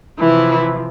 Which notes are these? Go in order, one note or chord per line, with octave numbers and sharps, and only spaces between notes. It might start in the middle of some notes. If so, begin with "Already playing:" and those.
C3 E3 F3 E4